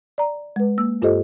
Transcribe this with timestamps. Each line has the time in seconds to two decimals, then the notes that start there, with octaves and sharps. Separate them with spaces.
0.18 D5 A#5
0.56 G#3 B4
0.78 A#3 E6
1.02 G2 F4 G4 A4 C5 D#5